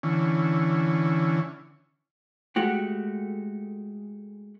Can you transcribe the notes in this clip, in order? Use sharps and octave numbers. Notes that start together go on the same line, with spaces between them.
D3 E3 C#4
G#3 A3 F#4 G4